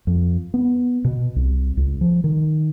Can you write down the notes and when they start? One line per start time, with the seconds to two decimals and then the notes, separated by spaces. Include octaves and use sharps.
0.07 F2
0.54 B3
1.05 B2
1.36 C2
1.77 C#2
2.01 F3
2.24 D#3